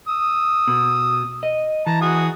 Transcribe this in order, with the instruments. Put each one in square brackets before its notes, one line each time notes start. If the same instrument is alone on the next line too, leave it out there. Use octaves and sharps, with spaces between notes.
[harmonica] D#6 E6
[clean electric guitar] B2
D#5
[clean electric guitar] E3 [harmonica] A5 A#5
[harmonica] F#4 G#4 D#6